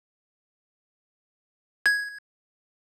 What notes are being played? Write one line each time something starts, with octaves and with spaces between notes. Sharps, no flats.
G#6